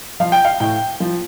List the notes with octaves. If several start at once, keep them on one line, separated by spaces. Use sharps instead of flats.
F3 F5
G5
F5
A2 G5
F3